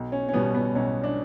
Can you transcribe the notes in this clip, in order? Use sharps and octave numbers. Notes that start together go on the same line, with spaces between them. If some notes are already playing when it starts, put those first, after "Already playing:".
Already playing: B1
C#4
C#4
B2 G3 B3
B3
B1 C#4
D4